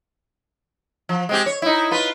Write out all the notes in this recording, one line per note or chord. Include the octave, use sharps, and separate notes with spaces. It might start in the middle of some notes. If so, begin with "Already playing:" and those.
F3
G#3 C4 G4
C#5
D#4 E4
F4 B4